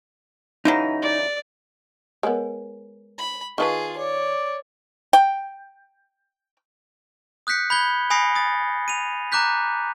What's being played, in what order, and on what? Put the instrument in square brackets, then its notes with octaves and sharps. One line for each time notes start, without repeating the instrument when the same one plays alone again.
[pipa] C#3 E3 F#3 [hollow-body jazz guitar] D#4
[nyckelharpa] D5
[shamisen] G#3 B3 [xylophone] A#4 C#5 G#5
[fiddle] B5
[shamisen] D#3 E4 B4 [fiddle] F4 G#4 [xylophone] F5 A5 C#6
[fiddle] C#5 [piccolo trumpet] D5
[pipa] G5
[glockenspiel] D#6 F#6 G6 B6 C#7
B5 G6 G#6 G7
G#5 B5 D#6 A#6 C7 C#7
D#6 A6
D#7 F7
A#5 D6 F#6 G6 B6